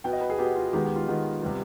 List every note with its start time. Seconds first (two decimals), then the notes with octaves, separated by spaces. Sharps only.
0.04 B2 B3 G5
0.13 D#5
0.21 B4
0.30 G#4
0.38 B2 B3 G4
0.56 F4
0.73 D#3 G#3 B3 G4
0.85 G4
0.96 F4
1.08 D#3 G#3 B3
1.42 C3 G3 B3